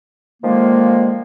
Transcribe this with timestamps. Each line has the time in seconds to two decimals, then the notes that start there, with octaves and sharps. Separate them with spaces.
0.42 D3 D#3 F3 G#3 A#3